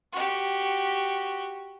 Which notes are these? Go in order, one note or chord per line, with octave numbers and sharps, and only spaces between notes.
F#4 G4